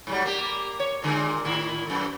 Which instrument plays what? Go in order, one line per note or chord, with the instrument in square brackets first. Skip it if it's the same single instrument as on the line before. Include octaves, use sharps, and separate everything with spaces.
[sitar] G#2 F#3 G3
A#3 G4
C#5
A#2 D3 G#3
A2 D#3 E4
F#2 A3